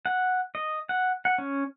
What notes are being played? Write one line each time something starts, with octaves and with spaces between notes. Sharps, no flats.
F#5
D#5
F#5
F#5
C#4